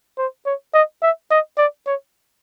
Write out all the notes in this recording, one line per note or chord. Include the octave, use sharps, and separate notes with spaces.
C5
C#5
D#5
E5
D#5
D5
C#5